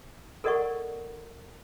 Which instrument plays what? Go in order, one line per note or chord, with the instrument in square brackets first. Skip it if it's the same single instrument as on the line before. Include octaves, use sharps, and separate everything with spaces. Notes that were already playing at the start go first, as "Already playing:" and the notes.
[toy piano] A4 A#4 D5 D#5 F#5 C#6